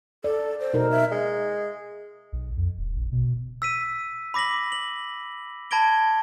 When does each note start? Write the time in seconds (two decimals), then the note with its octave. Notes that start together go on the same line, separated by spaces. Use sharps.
0.24 A4 D5
0.60 C5
0.73 B2 D#4 A#4
0.91 E5
1.12 G#3
2.32 B1
2.57 F2
2.78 D#1
2.96 A#1
3.12 B2
3.62 E6 B6 D#7
4.34 B5 D6 A#6 B6 F#7
4.72 F#7
5.71 A5 B5 G#6 A#6 D7 G7